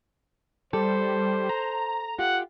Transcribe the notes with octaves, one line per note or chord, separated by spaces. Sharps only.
G3 A4 C5
A#5
F4 G4 F#5